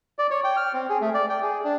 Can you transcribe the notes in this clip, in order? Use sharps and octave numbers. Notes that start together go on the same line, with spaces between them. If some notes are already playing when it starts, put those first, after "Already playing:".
D5
C#5
G5
F6
C4
G#4
A3
D5
G5
G#4
D4